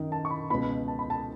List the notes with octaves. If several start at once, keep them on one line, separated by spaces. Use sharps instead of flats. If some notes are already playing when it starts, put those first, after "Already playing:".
Already playing: F#2 D#3
A5
C#6
B5
C#2 B2 B5
A5
B5
A5